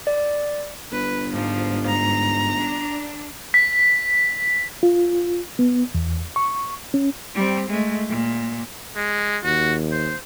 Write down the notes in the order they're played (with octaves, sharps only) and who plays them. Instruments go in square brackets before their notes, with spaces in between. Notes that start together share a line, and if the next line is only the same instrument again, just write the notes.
[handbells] D5
[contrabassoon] G1 [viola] B4
[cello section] G#2 [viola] F3
[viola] A#5
[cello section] D4
[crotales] B6
[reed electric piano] F4
B3
E2
C#6
C#4
[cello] G3 C4
G#3 A3
A#2
[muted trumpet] G#3
[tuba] D#2 [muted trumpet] F#4
[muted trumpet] C5